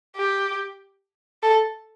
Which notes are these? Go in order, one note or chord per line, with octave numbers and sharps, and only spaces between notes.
G4
A4